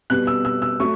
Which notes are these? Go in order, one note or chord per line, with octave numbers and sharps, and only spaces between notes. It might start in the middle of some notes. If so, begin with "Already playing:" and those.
B2 G3 B3 F#6
E6
E6
E6
F#3 A3 C#6